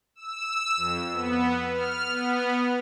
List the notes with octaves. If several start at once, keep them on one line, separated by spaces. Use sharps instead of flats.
E6
F2
B3
F6
B3